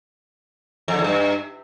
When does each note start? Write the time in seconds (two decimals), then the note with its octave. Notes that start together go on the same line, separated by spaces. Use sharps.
0.88 F2
0.94 D3
0.99 E2
1.04 G2